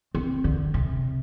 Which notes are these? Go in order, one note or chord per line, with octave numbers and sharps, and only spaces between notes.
C4
D3
C3